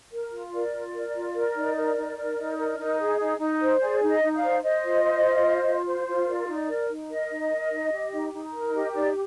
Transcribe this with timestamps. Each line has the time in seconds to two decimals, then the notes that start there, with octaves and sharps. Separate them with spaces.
0.12 A#4
0.32 F4
0.53 A#4 D5
0.73 F4
0.94 A#4
1.14 F4
1.35 A#4
1.56 D#4
1.76 A#4
1.96 D#4
2.18 A#4
2.38 D#4
2.58 A#4
2.79 D#4
2.99 G#4
3.20 D#4
3.40 D#4
3.61 C5
3.81 G#4 D5
4.02 D#4
4.08 D#5
4.22 D#4
4.36 D5 F5
4.42 C5
4.63 C5 D#5
4.84 F4
5.04 C5
5.25 F4
5.45 C5
5.66 F4
5.86 C5
6.07 F4
6.27 A#4 D5
6.47 D#4
6.69 A#4
6.89 D#4
7.10 A#4 D#5
7.31 D#4
7.51 A#4
7.71 D#4
7.92 G4
8.12 D#4
8.33 D#4
8.53 A#4
8.73 G4 D#5
8.94 D#4 D5